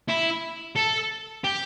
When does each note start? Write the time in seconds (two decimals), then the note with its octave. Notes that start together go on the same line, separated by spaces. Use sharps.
0.08 E4
0.76 A4
1.44 G4